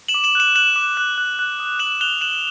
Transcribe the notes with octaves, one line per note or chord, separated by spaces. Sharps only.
E7 F#7
D6
E7 F#7
F#6 E7 F#7
F#6 E7 F#7
D6
F#6
F#6
F#6
D#6
F#6 E7 F#7
F#6 F7 G7
F#6 E7 F#7